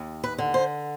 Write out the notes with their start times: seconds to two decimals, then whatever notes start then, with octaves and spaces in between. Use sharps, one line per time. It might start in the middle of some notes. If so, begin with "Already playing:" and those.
Already playing: D#2
0.24 B4
0.38 D3
0.54 C5